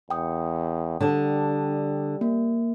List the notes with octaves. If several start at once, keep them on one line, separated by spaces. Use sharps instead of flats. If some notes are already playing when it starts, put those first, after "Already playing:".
E2 G5 D#6
D3 G3 D4
A#3